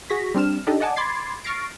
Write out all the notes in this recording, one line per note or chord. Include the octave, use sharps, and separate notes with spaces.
F#4 G#4 C#6 A#6 B6
G3 C4 D4 F6 E7
D4 D#4 G4 A4 D#5
D5 D#5 F#5 G#5 A5 D6
B5 C6 D6 G#6 A6 C7
C#6 F6 A6 A#6 C7 D7